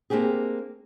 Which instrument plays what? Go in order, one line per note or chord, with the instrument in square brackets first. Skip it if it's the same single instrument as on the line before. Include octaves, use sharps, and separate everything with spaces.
[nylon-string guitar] A#3 C4 D4 G4 G#4